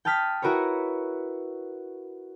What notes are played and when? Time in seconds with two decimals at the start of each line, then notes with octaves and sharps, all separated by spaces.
0.05 G5 A5 D#6 F6 B6
0.42 E4 F#4 A#4 B4 C#5